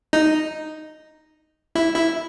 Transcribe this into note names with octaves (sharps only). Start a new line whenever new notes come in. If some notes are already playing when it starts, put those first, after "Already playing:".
D#4
E4
E4